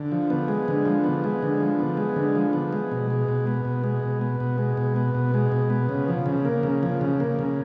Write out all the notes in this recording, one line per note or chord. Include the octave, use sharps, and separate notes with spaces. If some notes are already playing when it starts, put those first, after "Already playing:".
Already playing: D3
F3
B3
G#3
D3
F3
B3
G#3
D3
F3
B3
G#3
D3
F3
B3
G#3
B2
G#3
B2
B3
B2
G#3
B2
B3
B2
G#3
B2
B3
B2
G#3
B2
B3
C#3
F3
C#3
A#3
C#3
F3
C#3
A#3
C#3